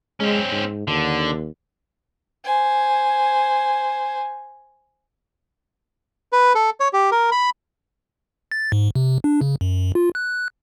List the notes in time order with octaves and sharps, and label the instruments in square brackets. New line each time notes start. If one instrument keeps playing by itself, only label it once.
[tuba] G#3 [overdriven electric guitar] C4 C#4
[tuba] G#2
[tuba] D#2 [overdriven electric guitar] D3
[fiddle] C5 G#5
[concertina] B4
A4
C#5
G4
A#4
B5
[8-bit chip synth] A6
G#2
C3
D4
C#3
F#2
F4
F#6